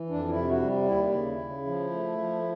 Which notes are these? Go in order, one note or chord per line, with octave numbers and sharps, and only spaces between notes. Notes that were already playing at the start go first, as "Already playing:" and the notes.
Already playing: E3
F2 D4
E4
C3
F#4
G3
D#2 E4
C#3
C#3
F3
A3
F3